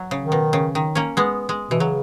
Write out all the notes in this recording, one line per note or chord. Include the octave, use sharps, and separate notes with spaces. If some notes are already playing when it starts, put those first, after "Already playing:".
Already playing: F#3
C#3
D#3
B2
C#3
D#3
A#3 C#4
G#3 B3
G#3
B2 E3
C#3 F#3